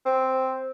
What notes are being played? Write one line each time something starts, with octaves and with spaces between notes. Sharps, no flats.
C4